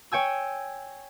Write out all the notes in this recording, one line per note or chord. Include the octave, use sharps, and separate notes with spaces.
C#5 G5 G#5 E6